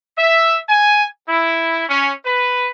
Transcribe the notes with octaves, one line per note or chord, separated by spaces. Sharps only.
E5
G#5
E4
C#4
B4